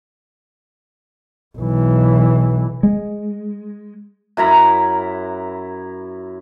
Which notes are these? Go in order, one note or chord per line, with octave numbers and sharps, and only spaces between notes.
B1 E3
G#3
F#2 E4 A#5 B5